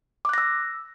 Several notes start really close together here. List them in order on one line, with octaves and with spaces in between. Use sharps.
D6 F#6 A#6 E6